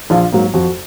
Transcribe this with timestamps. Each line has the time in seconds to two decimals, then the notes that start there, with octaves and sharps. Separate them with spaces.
0.10 A#1 F4
0.32 G#2 F#3 A#3
0.54 F2 F#4